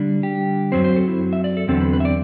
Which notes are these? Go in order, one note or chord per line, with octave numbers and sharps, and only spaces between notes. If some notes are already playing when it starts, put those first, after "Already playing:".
Already playing: D3 G3 D4
G4
F#2 F#3 C4 C5
C5
A4
E4
E5
D5
A4
E2 D3 F#3 C4 A4
B4
B4
E5
D5